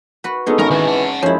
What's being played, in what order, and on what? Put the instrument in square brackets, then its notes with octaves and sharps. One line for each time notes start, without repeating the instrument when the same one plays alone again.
[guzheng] F#4 B4
[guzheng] G#3 C#4 D#4 [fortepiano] B3 G#4 A4
[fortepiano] G#1 [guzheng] B3 C#4 [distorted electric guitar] A#4
[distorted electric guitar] D#3 F#4 [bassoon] E3
[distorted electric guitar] F#5 A5
[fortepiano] F#2 G#3 [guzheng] F3 E4 [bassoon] C#4